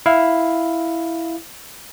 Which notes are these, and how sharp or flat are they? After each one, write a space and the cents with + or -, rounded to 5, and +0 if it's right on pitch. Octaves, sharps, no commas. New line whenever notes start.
E4 +0 F5 +0